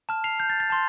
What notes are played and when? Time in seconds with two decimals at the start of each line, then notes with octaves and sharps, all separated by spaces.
0.09 A5 F6
0.24 C7 F7
0.40 G6
0.50 A6
0.60 A6
0.70 A5 C6